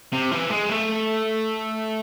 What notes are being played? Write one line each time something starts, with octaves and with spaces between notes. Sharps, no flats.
C3
E3
G#3
A3